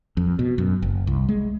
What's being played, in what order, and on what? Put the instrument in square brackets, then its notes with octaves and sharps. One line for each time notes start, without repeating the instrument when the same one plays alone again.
[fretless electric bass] F2
B2
F#2
F#1
C2
G#3